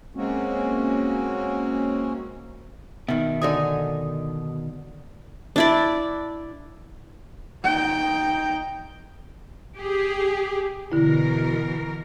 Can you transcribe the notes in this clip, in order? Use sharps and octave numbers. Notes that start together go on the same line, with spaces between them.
G#3 A#3 C4 C#4 F#4
B2 D#3 E5
D3 D#4 G#5 D#6
D4 E4 D5
D#4 G5
G4 G#4
B2 D3 E3 E4 A#4